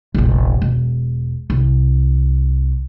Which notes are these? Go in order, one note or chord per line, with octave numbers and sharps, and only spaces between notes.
F1 A#1
E1
C2